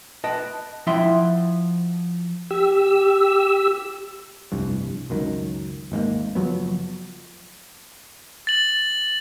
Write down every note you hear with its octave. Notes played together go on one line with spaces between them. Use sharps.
B4 D#5 G5 A5
F3 E4 E5 F#5 G5 C6
G4 E6
F1 C2 G2
C#2 F#2 D#3
G#1 G#2 C3 A#3
F#1 F3 F#3 B3
A6 F#7